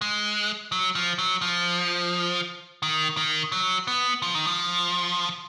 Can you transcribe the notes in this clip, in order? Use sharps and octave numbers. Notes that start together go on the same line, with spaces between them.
G#3
F#3
F3
F#3
F3
D#3
D#3
F#3
B3
F3
D#3
F3